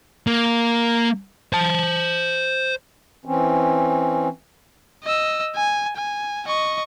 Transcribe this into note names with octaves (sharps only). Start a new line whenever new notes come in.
A#3
C5 A5
E3 C4 C#4
D#5 E6
G#5
G#5
D#5 C#6